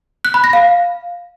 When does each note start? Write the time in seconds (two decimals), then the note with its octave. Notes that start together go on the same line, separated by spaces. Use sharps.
0.25 F#6
0.34 B5
0.44 A#6
0.53 F5